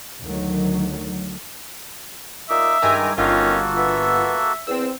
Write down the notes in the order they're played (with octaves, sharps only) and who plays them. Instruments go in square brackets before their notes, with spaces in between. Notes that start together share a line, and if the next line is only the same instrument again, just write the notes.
[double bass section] D2 D3 D#3 F#3
[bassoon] A#2 [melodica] D#4 D6 [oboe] E5
[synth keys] G2 G#5 A#5 [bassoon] D#3 [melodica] G#3 E4 D6
[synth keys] G1 F4 [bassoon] D#3 [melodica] A#3 F#4 A4 [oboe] C#4
[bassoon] B3 [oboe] E5
[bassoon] E2 [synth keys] C4 E6